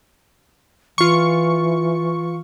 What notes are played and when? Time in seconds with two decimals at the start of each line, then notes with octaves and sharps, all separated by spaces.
0.98 E3 F4 C#6